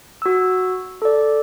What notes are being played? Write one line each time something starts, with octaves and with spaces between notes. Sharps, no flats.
F#4 E6
A4 D5